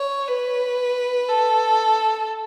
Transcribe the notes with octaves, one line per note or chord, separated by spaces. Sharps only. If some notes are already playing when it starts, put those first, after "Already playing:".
Already playing: C#5
B4
A4